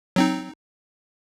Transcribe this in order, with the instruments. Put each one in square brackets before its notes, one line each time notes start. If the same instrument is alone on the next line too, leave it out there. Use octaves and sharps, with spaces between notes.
[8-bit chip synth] F#3 C4 D#4